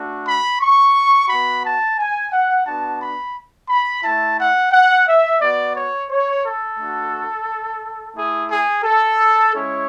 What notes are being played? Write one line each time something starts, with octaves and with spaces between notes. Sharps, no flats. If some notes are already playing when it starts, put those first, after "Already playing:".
Already playing: A3 D4 F#4
B5
C#6
B3 F#4 B5
A5
G#5
F#5
B3 D4 F#4 A5
B5
B5
A3 E4 A5
F#5
F#5
E5
B3 F#4 D5
C#5
C#5
A4
A3 D4 F#4
A3 E4 G#4
G#4
A4
G#3 C#4 E4 C#5